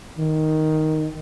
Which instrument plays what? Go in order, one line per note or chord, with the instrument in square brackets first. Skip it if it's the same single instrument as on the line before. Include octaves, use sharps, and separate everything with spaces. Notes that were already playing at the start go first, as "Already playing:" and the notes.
[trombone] D#3